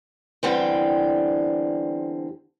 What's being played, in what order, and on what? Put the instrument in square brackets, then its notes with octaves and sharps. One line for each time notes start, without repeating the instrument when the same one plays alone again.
[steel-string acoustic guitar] E2 D3 G3 C4